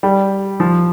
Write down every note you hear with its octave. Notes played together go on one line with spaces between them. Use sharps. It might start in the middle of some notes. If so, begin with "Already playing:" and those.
G3
F3